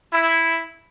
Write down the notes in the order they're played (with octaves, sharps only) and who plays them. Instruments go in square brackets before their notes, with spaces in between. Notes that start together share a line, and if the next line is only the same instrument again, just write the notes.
[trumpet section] E4